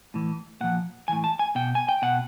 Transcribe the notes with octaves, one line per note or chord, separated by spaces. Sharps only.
A2 E3
A#2 F3 F#5
A2 E3 G#5
A5
G#5
B2 G5
G#5
G5
B2 F#5